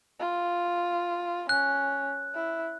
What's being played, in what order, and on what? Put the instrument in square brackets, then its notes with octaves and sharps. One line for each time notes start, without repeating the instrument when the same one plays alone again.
[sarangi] F4
[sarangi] C#4 [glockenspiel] F#6
[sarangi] E4